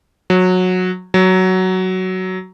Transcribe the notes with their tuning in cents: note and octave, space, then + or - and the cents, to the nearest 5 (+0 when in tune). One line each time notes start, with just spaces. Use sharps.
F#3 -15
F#3 +10